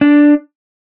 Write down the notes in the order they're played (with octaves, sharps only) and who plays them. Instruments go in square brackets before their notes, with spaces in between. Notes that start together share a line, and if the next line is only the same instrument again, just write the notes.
[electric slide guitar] D4